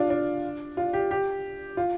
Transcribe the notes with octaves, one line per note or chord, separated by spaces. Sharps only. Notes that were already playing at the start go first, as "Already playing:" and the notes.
Already playing: D4 F4
D4
F4
G4
G4
F4